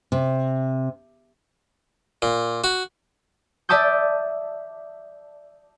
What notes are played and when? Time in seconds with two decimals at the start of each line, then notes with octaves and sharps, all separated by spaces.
0.12 C3
2.22 A#2
2.64 F#4
3.69 D5 E5 A5 D6 D#6 G6